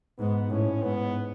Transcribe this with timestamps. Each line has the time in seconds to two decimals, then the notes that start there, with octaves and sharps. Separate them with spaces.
0.18 G#2 B3
0.50 A2 C#4
0.83 G#2 B3